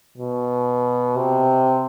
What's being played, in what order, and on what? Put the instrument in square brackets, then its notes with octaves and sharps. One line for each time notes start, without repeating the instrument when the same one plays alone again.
[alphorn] B2
C3